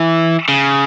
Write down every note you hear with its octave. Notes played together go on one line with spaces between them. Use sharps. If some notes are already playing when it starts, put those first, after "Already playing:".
Already playing: E3
C#3